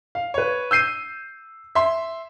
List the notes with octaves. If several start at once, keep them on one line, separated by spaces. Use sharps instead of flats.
F5
B4 C#5
E6 G6 C7 D#7
E5 C6